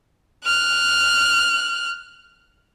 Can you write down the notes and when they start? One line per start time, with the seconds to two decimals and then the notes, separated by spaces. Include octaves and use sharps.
0.45 F6 F#6